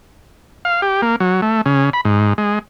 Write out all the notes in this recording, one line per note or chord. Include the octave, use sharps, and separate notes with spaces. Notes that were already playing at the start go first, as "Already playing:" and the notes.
F5
G4
A#3
F#3
A3
C#3
B5
G#2
G#3